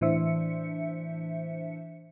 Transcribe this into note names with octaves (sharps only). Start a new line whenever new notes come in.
A2 E3 D4 C5 E5 C#7